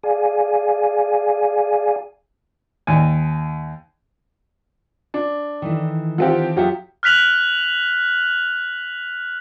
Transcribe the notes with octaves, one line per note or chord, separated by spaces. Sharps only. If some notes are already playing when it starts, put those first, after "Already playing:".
G#4 D5 F5 G#5
D#2 G#5
D4
D#3 E3 A3
F3 C4 F4 G4 F#5
F#3 F4 G4 G#4 E5 F#5
F6 F#6 B6 F7 F#7